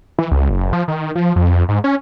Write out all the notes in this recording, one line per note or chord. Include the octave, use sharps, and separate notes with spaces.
E3
C#2
F#1
F3
D#3
F3
F2
G#2
C#4